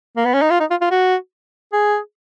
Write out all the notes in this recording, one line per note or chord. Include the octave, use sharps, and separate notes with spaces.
A#3
B3
C#4
D#4
F4
D#4
F4
F4
F#4
G#4